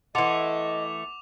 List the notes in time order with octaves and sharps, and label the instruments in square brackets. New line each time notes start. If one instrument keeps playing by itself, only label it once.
[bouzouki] E3 A3 [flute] D#5 [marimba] F#5 C6 [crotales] D6 F7